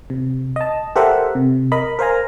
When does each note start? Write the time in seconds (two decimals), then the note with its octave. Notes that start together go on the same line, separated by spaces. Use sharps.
0.10 C3
0.56 D#5 A5
0.96 G4 A4 A#4 C5 E5 F#5
1.35 C3
1.72 A#4 D#5 B5
1.99 A#4 C5 F5 G#5 A#5